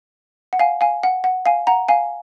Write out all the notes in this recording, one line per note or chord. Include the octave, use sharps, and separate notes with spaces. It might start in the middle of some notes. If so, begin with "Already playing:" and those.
F#5
F5 G#5
F5 G#5
F#5
F#5
F5 G#5
F#5 A#5
F5 G#5